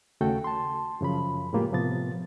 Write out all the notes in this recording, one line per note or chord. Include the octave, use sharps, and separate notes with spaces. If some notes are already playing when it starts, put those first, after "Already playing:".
D#2 C#3 A3 F#4 A4 G5
A5 C6
F#2 C#3 F3 B5
A2 G#3 A#3 F4 G4
A2 C3 F3 B3 A6